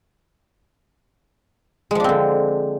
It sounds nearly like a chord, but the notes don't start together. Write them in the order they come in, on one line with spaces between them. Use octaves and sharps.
G#3 F3 D4 C4 D3